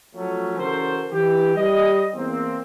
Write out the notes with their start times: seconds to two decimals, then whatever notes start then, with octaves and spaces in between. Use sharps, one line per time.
0.14 F3 F#3 A3 C#4
0.57 C#3 E3 F#4 A4 A#4 C5
1.12 E3 G4
1.56 G3 D#5
2.14 E2 A#3 C4